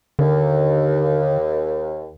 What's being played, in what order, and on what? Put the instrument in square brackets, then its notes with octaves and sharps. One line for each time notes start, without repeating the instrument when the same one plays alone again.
[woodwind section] D#2 [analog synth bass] D3